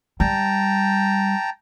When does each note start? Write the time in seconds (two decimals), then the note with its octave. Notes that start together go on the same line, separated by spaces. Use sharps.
0.20 G3 G5 A5 A#5